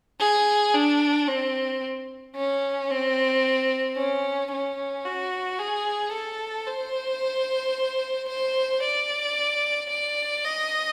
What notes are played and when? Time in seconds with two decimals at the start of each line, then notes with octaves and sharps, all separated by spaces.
0.20 G#4
0.74 D4
1.28 C4
2.36 C#4
2.90 C4
3.97 C#4
4.51 C#4
5.05 F#4
5.59 G#4
6.13 A4
6.67 C5
8.29 C5
8.83 D5
9.90 D5
10.44 D#5